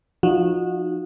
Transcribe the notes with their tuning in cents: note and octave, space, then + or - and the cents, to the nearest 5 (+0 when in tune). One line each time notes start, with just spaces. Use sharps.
F3 +0 D#4 -15 F#4 -25